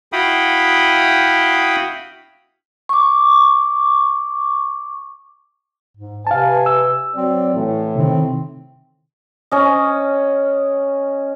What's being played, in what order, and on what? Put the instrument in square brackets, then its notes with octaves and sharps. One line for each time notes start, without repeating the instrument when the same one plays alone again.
[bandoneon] E4 F#4 F5 G5 B5 D#6
[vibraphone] C#6 D6
[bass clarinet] G#2
[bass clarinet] C3 [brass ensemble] B4 G#5 [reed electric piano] F5 A5
[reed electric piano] E6
[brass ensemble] F#3 D5 [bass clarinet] C4
[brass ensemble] A2 [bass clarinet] E3
[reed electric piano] C3 D#3 [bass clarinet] C4
[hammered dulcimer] C#4 D#5